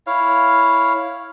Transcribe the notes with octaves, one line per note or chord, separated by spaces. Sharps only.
E4 C#5 F5